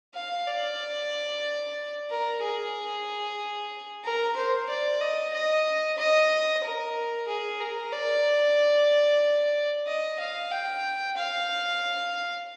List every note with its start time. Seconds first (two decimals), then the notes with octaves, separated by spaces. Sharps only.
0.15 F5
0.47 D5
2.10 A#4
2.42 G#4
4.04 A#4
4.36 C5
4.69 D5
5.00 D#5
5.33 D#5
5.98 D#5
6.63 A#4
7.27 G#4
7.60 A#4
7.92 D5
9.86 D#5
10.19 F5
10.51 G5
11.16 F5